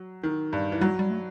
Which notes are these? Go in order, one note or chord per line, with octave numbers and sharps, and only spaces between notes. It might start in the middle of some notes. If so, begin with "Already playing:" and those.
Already playing: F#3
D#3
G2
E3
F#3 G3
G3
A3